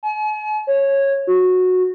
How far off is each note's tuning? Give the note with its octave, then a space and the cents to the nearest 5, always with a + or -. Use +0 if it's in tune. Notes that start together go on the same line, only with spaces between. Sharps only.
G#5 +45
C#5 -15
F#4 -15